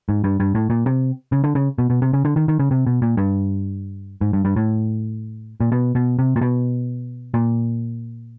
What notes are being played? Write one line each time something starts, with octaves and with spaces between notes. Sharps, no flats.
G#2
G2
G2
A2
A#2
C3
C#3
D3
C#3
B2
B2
C3
C#3
D3
D#3
D#3
C#3
C3
B2
A#2
G2
G#2
G2
G2
A2
A#2
B2
B2
C3
A#2
B2
A#2